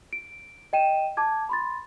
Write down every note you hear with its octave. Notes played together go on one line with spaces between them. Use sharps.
D7
D#5 G5 D#7 E7
A5 D6 G#6
B5 C6 A6